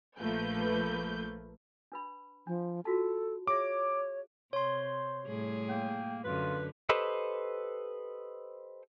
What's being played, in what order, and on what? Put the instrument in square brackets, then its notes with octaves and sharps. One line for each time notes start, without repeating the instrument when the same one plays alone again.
[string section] A#1 F3 A3 A#3 B4 G6
[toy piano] D4 B4 B5
[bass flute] F3 [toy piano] D4
[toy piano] F4 F#4 A5 [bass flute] A4
[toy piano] G#4 E5 [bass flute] C#5 [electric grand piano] D6
[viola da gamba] C3 [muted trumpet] C5 [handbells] C#5 C6
[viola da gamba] A2 G3 G#4
[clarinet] A#3 [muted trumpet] G5
[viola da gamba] F#2 D3 [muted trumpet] F4 [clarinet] B4
[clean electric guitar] G4 A4 B4 C5 D#5